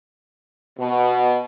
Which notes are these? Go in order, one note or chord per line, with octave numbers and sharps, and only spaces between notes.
B2